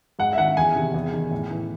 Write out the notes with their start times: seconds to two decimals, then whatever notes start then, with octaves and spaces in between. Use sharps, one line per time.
0.19 G#2 F#5
0.33 E5
0.38 D#3 F#5
0.56 E2 G#5
0.75 C3 D#3
0.94 E2
1.13 D#3
1.31 A2
1.51 E3